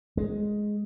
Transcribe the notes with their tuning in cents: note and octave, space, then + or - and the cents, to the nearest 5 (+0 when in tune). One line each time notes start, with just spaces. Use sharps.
G#3 +5